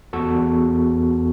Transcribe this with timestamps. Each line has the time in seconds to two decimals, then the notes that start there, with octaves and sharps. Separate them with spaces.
0.13 E2 F#4 A4
0.36 E2